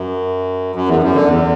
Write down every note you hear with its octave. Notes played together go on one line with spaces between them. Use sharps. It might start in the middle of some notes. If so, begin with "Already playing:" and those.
Already playing: F#2
F#2
E2
F#2
D3
E2